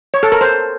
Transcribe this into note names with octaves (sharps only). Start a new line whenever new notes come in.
C#5
A4
A#4
C5